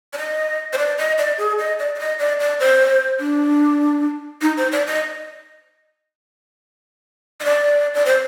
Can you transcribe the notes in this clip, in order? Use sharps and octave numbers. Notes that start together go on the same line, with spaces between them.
D5
D#5
C5
D5
D#5
D5
G#4
D#5
D5
D5
D#5
D5
D5
C5
D4
D#4
C5
D5
D#5
D#5
D5
D5
C5